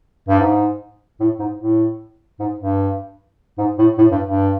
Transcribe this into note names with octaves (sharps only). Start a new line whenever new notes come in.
G2
G#2
A2
G#2
A2
G#2
G2
G#2
A2
A2
G2
G2